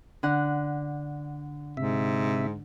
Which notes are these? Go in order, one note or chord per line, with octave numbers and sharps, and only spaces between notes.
D3 F#5
G#2 C3 E5